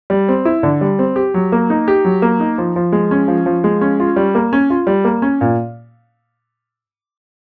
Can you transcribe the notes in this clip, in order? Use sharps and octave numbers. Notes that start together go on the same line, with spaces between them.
G3
C4
E4
D3
G3
C4
G4
F#3
A#3
D#4
G4
F#3
A#3
D#4
F3
F3
G#3
C#4
F3
F3
G#3
C#4
F4
G3
A#3
C#4
F4
G3
A#3
C#4
A#2